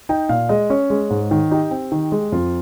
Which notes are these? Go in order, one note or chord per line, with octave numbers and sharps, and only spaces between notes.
D#4 G5
A#2 F5
G#3 D#5
C#4 C#5
G#3
G#2
D#3
D#4 G4
C4
D#3
G#3
F2 F4